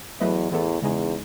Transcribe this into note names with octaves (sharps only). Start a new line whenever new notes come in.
E2 F#3 A3 E4 B4 D#5
E2 A2 E3 B3 E4 A4
E2 C#3 G#3 D#4 G#4